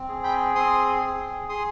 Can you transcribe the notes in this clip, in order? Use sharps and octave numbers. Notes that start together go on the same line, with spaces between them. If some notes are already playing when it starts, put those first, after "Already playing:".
Already playing: C4
G#4
G5 B5
C4 C6 D#6
G#4
G#4 C6 D#6